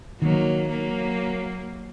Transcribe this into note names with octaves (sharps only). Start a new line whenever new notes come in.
D#3 F#3 A#3
F#3 A#3